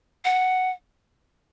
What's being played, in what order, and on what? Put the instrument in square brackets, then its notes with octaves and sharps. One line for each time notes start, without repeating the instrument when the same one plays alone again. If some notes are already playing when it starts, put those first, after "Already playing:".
[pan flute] F#5